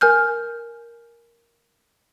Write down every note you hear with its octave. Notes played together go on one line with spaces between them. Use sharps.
A#4 G#5 F6 G6